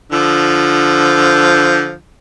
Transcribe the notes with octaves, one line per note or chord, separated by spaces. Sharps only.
D3 F3